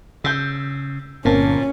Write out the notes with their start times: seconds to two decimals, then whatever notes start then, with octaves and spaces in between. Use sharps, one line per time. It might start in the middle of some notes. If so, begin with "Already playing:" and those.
0.24 C#3 E6 G6
1.25 G1 A#2 A#3 C4 C#4 A5